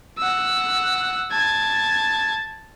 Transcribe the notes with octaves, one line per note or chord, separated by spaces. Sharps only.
F#5 E6
A5 G#6